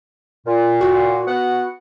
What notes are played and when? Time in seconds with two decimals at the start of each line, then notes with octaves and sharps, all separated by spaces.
0.46 A#2
0.81 F#4
1.27 B3 F#5